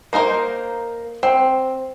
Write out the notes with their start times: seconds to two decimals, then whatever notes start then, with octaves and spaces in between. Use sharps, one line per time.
0.13 A#3 D#4 A#4 C5
1.23 C4